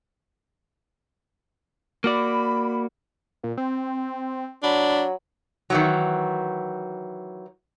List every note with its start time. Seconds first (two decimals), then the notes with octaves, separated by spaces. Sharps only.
2.04 A#3 F#4 D5 B5
3.43 A#2
3.57 C4
4.63 F#3 D4 B5
5.70 D#3 E3 F#3